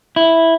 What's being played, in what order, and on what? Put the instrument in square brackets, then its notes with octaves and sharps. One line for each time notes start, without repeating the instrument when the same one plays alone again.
[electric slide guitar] E4